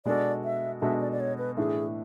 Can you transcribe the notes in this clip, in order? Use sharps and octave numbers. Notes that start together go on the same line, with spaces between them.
B2 G#3 D4 F#4 A4 D5
E5
B2 G#3 D4 F#4 A4 E5
D5
D5
C#5
B4
A2 E3 A3 D4 G#4